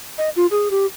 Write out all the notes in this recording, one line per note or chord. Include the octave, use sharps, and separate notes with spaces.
D#5
F4
G#4
G4